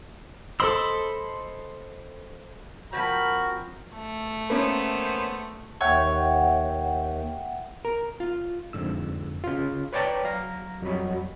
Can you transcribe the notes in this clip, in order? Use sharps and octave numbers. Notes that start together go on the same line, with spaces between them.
A4 C5 D#5 B5 C6 E6
F3 A#3 C4 F#4 A#4 B5
A3
A#3 B3 C#4 C5
D#2 C#5 E5 F#5 G5
A#4
F4
F2 G#2 D3 E6
C#3 F4
B4 C#5 D5 G5 A5 A#5
F#3 F5 A#5
F2 F#3 G3 D#5 B5